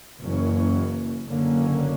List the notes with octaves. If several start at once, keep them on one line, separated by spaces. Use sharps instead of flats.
F#1 F#2 E3 A#3 C#4
F#1 F#2 D3 A#3 C#4